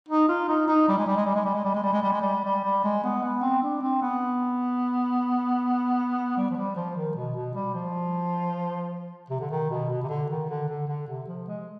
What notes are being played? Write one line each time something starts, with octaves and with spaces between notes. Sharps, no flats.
D#4
F4
D#4
D#4
G3
G#3
G3
G#3
G3
G#3
G3
G#3
G3
G#3
G3
G#3
G3
G#3
G3
G3
G3
G#3
B3
B3
C4
D4
C4
B3
G3
F3
G3
F3
D#3
B2
B2
G3
F3
C3
D3
D#3
B2
B2
C3
D3
D#3
D3
D3
D3
C3
F3
G#3